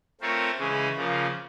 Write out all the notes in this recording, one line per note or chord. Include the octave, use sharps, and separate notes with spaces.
A3 C4 F4 A#4 C#5
C#3 E3 G#3 C#4 E4
C#3 F3 A#3